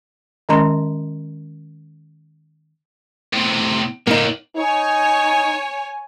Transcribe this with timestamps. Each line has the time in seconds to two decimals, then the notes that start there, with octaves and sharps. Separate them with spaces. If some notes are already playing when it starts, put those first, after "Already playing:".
0.49 D#3 G#3 C#4 D#5 A#5 C6
3.33 A2 C3
4.07 A2 D3 A#3 D#4
4.56 D#4 C#5 G#5